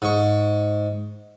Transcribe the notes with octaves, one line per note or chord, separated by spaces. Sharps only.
G#2 C#6